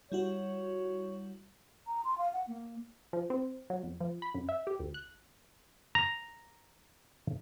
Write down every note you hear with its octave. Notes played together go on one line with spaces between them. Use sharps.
G3 E4 F#4 C#5
A#5
C6
F5
F#5
A#3
F3
C4
F#3
F2
F3
B5
F#2
E5
G4
D2
F#6
A#5